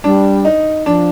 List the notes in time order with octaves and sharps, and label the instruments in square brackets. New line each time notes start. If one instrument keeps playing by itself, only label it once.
[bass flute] G3 [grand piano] D4
[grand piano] D#4
[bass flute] F3 [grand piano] D4